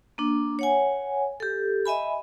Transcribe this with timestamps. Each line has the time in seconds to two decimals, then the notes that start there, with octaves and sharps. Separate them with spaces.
0.18 A#3 D4
0.59 C#5 F#5 G#5
1.40 G4 A4
1.86 D#5 E5 G#5 B5